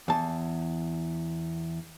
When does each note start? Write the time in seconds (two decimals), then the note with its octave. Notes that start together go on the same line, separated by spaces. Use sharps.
0.08 E2 A5